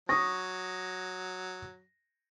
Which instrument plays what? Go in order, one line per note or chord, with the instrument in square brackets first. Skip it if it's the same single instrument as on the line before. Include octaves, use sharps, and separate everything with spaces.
[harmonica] F#3 [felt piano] C#6 D#6 A#6